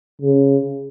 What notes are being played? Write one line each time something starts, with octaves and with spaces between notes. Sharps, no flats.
C#3